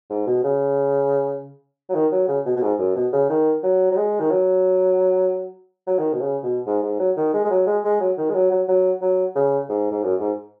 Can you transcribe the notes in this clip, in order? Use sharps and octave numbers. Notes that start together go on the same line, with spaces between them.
G#2
B2
C#3
F#3
D#3
F#3
C#3
B2
B2
G#2
F#2
B2
C#3
D#3
F#3
F#3
G#3
D#3
F#3
F#3
D#3
B2
C#3
B2
G#2
G#2
F#3
D#3
G#3
G#3
F#3
G#3
G#3
F#3
D#3
G#3
F#3
F#3
F#3
F#3
C#3
G#2
G#2
F#2
G#2